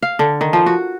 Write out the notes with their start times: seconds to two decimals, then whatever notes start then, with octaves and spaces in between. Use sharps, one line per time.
0.03 F5
0.19 D3
0.41 D#3
0.53 F3
0.66 F#4